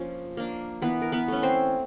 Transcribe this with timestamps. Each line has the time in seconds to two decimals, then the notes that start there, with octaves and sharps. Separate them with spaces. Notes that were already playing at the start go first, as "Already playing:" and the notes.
Already playing: F3 A#3 C#4 D4
0.37 A#3 D4
0.82 E3 B3 B4
1.02 A#4
1.12 B3 B4
1.28 A3 C#4
1.43 C4 C5